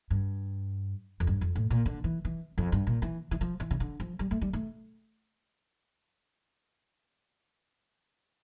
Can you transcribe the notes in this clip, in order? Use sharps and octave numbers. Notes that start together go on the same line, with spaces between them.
G2
F2
G2
F2
A2
A#2
D3
E3
E3
F2
G2
A#2
E3
E3
F3
E3
C#3
D3
F3
G3
A3
G3
A3